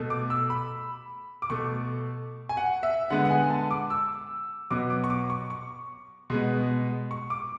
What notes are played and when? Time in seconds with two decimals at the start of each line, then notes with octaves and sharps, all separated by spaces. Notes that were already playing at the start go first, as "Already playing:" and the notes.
Already playing: B2 A3
0.10 D6
0.30 E6
0.50 B5
1.42 D6
1.50 B2 A3 C#6
2.49 G#5
2.57 F#5
2.83 E5
3.10 D3 G#3 B3 F#5
3.25 F#5
3.30 G#5
3.50 A5
3.71 D6
3.90 E6
4.71 B2 F#3 B3 D6
4.90 D6
5.04 C#6
5.10 D6
5.30 C#6
5.50 C#6
6.30 B2 G#3 B3
7.11 C#6
7.30 D6